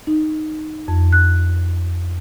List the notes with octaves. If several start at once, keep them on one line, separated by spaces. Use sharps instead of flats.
D#4
F2
F#6